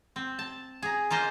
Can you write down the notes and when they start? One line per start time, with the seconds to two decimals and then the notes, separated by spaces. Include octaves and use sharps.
0.16 C4
0.39 A5
0.82 G#4 A#5
1.10 A#3 F4 C5 D#5